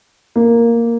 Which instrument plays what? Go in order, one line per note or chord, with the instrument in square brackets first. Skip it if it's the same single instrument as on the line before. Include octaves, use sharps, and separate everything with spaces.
[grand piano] A#3